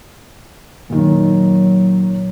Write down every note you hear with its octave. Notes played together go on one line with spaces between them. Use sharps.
A#2 D#3 F#3